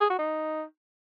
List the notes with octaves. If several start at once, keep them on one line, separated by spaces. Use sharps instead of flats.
G#4
F#4
D#4